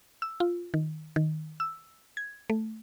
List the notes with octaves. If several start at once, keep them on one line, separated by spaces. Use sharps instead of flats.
E6
F4
D#3
D#3
E6
G#6
A3